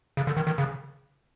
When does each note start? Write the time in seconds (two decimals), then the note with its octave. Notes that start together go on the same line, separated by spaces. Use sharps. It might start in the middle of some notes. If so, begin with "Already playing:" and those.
0.17 C#3
0.27 D3
0.37 D#3
0.47 D#3
0.58 C#3